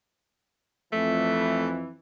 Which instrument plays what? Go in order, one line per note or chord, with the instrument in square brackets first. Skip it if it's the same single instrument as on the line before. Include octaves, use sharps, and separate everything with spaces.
[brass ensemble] F2 E3 [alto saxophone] A3